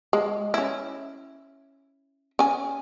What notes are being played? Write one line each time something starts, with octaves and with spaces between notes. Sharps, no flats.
G#3
C#4 E4
C#4 G#5